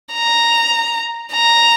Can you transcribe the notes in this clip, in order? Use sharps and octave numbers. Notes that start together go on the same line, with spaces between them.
A#5
A#5